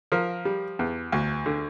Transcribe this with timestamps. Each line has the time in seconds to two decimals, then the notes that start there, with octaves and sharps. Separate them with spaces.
0.12 F3 A#4
0.45 G3
0.79 E2
1.12 D2
1.46 D3